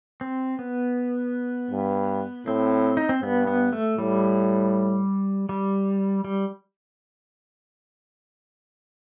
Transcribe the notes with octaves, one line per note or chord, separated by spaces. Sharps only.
C4
B3
G2
A2 C4
D#4
C4
G2 B3
B3
A3
A2 G3
G3
G3